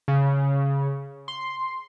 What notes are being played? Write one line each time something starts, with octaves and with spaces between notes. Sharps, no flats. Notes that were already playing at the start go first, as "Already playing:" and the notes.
C#3
C6